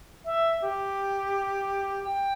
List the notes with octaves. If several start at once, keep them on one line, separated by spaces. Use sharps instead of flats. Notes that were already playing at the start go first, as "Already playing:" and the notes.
E5
G4
G5